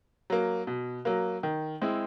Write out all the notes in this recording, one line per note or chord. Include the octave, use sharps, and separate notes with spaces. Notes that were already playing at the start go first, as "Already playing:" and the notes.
F#3 A#3
B2
F#3 A#3
D#3
G#3 C4 E4